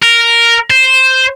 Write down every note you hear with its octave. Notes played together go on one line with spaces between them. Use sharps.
A#4
C5